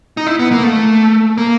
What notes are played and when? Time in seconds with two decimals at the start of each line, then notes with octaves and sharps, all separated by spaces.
0.17 D#4
0.27 E4
0.39 B3
0.51 A#3
0.63 A3
1.38 A#3